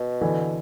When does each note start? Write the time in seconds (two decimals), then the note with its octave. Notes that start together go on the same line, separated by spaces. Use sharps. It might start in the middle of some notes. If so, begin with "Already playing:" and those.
Already playing: B2
0.21 D3 E3